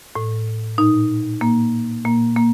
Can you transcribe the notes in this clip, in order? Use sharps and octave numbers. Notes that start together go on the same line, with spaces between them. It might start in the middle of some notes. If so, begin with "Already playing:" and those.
A2
A#2 D#4
A#2 A#3
A#2 A#3
A#3